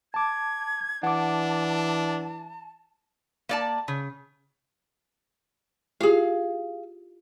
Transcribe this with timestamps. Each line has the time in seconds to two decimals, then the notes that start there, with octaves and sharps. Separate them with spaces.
0.14 A5 D6 G#6
1.03 E3 D4 F#5 A5 D6
3.49 A#3 D5 A5
3.88 C#3
6.00 E4 F4 G4 G#4 F5